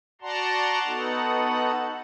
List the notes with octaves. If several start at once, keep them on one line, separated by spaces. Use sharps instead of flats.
F#4 D5 F#5 A5 A#5 C6
B3 D#4 F#4 A4 F#5